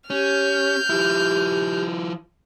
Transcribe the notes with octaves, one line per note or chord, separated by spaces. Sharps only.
C#4 G4 F6 G6
F3 E4 G4